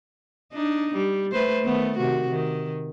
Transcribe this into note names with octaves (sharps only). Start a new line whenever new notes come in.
D4 D#4
G3
A3 B4 C5
D#3 A3 B3
C3 D#3 F#4
D#3